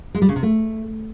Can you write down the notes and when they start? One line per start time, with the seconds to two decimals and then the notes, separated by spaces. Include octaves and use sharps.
0.14 G#3
0.22 G3
0.29 C#3
0.36 C3
0.43 A3